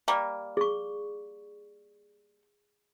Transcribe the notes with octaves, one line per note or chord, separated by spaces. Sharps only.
G3 A#3
G#4 C#6